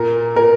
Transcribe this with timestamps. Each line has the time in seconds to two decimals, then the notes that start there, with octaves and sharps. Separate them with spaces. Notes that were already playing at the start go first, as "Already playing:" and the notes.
Already playing: A#2 A#4
0.36 A#2 A#4